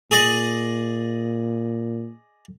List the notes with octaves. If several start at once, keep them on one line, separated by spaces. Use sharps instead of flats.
A#2 G#4 D5 D#5